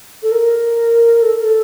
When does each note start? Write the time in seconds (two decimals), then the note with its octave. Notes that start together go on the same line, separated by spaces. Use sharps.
0.23 A4
0.32 A#4
1.22 A4
1.39 A#4
1.44 A4